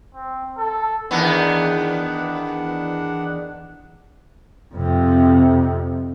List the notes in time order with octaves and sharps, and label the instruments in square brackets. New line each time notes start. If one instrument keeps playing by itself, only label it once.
[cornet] C4
A4
[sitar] E2 D#3 B3 [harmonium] D4 F#5
[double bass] F2 C3